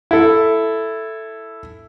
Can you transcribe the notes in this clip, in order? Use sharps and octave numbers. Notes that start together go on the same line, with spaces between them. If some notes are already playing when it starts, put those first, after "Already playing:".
E4 A4